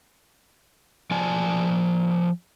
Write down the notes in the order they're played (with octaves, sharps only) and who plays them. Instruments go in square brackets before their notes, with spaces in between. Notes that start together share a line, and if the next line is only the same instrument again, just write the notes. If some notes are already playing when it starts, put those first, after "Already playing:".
[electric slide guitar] F3 D5 G#5 A5